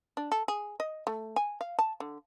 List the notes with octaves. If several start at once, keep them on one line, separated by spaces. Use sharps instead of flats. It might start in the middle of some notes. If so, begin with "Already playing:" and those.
D4
A4
G#4
D#5
A3
G#5
F5
A5
D3